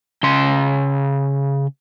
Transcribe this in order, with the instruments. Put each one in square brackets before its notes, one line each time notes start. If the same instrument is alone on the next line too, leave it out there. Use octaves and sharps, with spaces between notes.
[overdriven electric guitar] C#3 C6